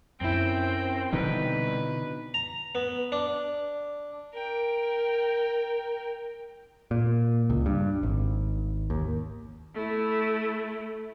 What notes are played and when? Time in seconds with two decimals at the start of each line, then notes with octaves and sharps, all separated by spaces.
0.21 F#2 C4 E4 G5
1.13 C2 B2 D3 E3 D#4 B4
2.34 A#5
2.75 B3
3.12 D4
4.33 A#4 G5
6.91 A#2
7.50 C#2
7.66 G2
8.03 G#1
8.90 D#2
9.74 A3 E4